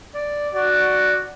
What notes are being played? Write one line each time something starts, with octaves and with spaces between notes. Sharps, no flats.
D5
F#4 D5